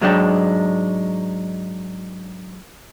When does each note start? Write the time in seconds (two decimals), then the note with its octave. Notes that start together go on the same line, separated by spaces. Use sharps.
0.01 G#2 F#3 G#3 D4 G5